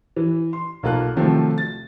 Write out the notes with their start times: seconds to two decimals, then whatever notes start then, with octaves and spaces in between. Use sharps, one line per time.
0.16 E3
0.53 C6
0.83 B1 A#3 F4 A4 F#6
1.16 C3 D#3 F3 F#3 A3 C4
1.58 A6